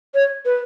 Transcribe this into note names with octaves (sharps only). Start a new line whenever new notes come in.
C#5
B4